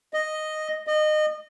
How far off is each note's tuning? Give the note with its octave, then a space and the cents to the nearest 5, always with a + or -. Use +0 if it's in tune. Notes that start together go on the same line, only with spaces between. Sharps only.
D#5 -5
D#5 -25